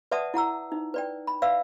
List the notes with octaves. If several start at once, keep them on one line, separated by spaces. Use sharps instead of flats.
B4 D5 E5 F#5 A5 D#6
E4 F#5 A#5 E6
D#4
B4 D5 G5
B5
B4 D5 E5 F5 E6